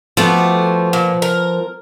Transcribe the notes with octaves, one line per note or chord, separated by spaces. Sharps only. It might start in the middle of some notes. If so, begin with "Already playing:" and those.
F3 A3 B3 F#4 G4
A#2
A#4